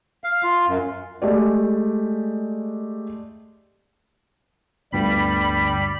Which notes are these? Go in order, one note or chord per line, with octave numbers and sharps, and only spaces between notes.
F5
F4
F#2
G#3 A3 G4 D5
G1 D2 G2 G3 B5